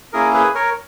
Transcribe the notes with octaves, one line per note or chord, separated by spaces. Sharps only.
A#3 C#4 E4 G#4 A#4
G#4 B4
A#4 C#5